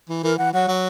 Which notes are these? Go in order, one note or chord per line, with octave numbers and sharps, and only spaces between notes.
E3
E3 A#4
E3 F#5
F#3 F#5
F#3